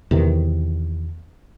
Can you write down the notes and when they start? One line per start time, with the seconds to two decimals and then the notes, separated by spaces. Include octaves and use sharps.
0.11 E2 C3 D#3